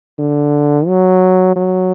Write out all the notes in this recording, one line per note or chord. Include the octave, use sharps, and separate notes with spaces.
D3
F#3
F#3